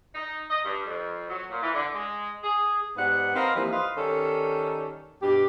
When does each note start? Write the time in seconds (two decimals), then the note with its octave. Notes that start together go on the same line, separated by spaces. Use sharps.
0.15 D#4
0.51 D#5
0.65 G2
0.86 F2
1.30 F#3
1.51 A#2
1.62 E3
1.74 D3
1.94 G#3
2.44 G#4
2.97 G#2 G3 B3 B4 F#5
3.36 C4 A#4 B4 D#5 F5
3.54 E3 F3 G3 A#3 D#4
3.72 B4 C5 D#5 F5
3.97 D#3 G3 C#4 A4
5.22 G2 B2 G4